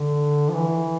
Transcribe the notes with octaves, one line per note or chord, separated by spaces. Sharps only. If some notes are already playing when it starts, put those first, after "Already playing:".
Already playing: D3
F3
E3